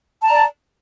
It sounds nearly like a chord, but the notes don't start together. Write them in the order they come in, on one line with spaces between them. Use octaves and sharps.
A5 A#5 D5